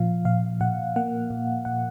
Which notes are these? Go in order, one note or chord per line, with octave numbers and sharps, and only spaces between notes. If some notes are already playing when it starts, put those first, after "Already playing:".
Already playing: A#2 F3 F5
A#2 F5
A#2 F#5
A#3 F#5
A#2
A#2 F#5